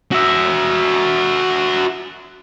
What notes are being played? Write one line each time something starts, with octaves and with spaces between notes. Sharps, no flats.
F#4 E5